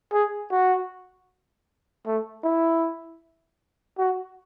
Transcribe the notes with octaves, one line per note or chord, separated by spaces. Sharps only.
G#4
F#4
A3
E4
F#4